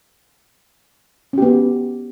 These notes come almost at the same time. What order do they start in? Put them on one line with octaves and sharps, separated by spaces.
C#4 G4 B3